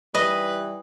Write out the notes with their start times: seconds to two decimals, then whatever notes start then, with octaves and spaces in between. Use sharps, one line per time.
0.15 E3 G3 B4 D#5